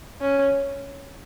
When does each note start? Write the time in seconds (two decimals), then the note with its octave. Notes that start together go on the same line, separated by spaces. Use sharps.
0.20 C#4